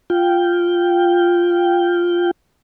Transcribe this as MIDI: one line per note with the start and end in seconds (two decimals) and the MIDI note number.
0.10 2.31 65
0.10 2.31 79